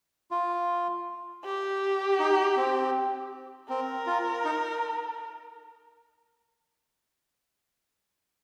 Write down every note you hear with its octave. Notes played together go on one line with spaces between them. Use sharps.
F4
G4
D#4
C4
C4 A#4
F4
D#4